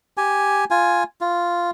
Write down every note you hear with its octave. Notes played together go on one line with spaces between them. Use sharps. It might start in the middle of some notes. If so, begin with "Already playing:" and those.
G4 G#5
F4 G#5
F4